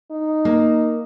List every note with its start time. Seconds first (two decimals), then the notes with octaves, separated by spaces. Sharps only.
0.11 D#4
0.45 A#3